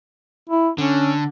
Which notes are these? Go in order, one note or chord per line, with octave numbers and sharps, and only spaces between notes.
E4
D3 C#4